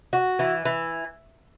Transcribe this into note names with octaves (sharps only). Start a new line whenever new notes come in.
F#4
E3
E3